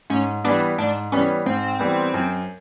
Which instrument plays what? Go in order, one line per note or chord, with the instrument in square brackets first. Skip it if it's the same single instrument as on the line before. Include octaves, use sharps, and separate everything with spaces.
[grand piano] G#2 [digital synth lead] C#4
[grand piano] E3 G3 B3 [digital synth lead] D4
[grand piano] G#2 [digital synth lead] D4
[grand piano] E3 G3 B3 [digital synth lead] C#4
[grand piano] G#2 [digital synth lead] C4
[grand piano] E3 G3 B3
F#2